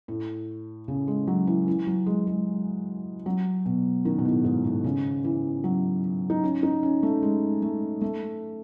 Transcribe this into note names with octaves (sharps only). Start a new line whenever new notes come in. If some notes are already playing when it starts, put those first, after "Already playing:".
A2
C#3
G#3
F#3
E3
E3
F#3
G#3
G#3
F#3
B2
D#3
B2
A2
G#2
A2
C#3
E3
F#3
D#4
C#4
D#4
C#4
A3
G#3
A3
A3